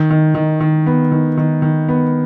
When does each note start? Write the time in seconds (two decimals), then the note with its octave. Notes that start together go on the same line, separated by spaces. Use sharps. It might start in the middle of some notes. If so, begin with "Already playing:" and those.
Already playing: D#3
0.10 D#3
0.35 D#3
0.60 D#3
0.86 B3
1.12 D#3
1.37 D#3
1.62 D#3
1.89 B3